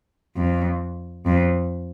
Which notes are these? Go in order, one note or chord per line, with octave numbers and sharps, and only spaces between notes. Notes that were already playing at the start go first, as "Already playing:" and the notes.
F2
F2